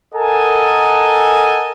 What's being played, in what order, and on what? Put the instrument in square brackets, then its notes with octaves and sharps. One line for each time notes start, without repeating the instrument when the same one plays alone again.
[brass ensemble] A4 A#4 D#5 F#5 G#5 A5